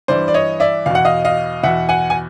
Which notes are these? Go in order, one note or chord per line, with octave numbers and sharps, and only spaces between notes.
G2 E3 C5 D5
D5
C#5 D#5
D5 E5
E2 B2 F5
F#5
D#5 F5
D#5 F5
E2 B2 E5 F#5
F#5 G#5
G#5